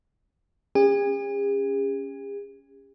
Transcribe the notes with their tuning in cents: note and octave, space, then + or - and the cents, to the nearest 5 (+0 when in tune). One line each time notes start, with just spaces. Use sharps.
C#4 +0 G#4 -45